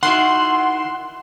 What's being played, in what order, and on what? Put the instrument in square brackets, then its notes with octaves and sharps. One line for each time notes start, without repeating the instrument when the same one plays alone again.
[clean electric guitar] D#3 E4 F#4 [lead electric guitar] F#5 [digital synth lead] C6